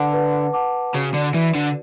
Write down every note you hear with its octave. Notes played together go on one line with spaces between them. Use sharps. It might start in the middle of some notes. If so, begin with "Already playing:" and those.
Already playing: D3 B4 F#5 A5 D6
B4
F#5 A5 D6
C#3 F#4
D3
E3 B4 D5
D3